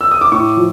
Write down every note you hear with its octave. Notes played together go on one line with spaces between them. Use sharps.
E6
D#6
D6
A2 C#6
F3